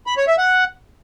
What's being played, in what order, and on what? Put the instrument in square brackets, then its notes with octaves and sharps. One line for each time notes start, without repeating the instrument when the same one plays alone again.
[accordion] B5
C#5
E5
F#5